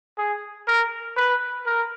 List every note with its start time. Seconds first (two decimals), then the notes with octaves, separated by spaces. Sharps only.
0.18 G#4
0.68 A#4
1.17 B4
1.66 A#4